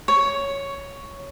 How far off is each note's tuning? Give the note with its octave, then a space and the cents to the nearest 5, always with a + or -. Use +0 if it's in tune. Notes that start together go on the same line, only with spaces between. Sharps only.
C#5 +5